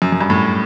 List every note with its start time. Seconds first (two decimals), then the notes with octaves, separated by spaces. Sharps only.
0.02 F#2
0.12 F#2
0.21 G2
0.30 A2